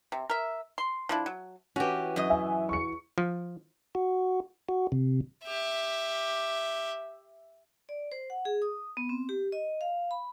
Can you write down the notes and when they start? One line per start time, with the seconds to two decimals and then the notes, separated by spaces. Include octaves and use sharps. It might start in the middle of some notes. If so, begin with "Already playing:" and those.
0.12 C3
0.30 A#4 E5
0.78 C6
1.09 F3 D4 E4
1.26 F#3
1.76 E3 C#4 F#4 G4
2.16 F#2 D#5
2.30 E5 G#5
2.69 C#6 C#7
3.18 F3
3.95 F#4
4.69 F#4
4.92 C3
5.45 G4 E5
7.89 D5
8.12 C5
8.30 F#5
8.45 G#4
8.62 D#6
8.97 B3
9.09 C4
9.29 G4
9.52 D#5
9.81 F5
10.11 B5